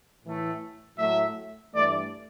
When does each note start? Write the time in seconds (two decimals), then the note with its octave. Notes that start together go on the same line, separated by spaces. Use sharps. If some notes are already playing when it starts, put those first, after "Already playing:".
0.24 A2 E3 A3
0.98 A2 F#3 A3 E5
1.73 G2 E3 A3 D5